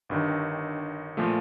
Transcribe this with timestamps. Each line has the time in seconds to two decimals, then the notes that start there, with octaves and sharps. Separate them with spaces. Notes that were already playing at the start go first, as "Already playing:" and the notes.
0.09 G1 G2 D#3
1.17 A#2 F3 A3